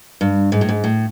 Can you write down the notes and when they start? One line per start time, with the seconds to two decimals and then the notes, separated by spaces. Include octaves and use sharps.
0.21 G2
0.52 G#2
0.61 A2
0.69 G#2
0.84 A2